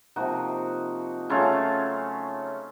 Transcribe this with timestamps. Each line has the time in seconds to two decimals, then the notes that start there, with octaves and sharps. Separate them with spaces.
0.16 C3 F3 A#3 D#4 F#4
1.30 C#3 F#3 A3 C#4 F4